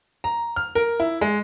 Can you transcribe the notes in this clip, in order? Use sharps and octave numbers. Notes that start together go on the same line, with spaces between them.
A#5
F6
A#4
E4
G#3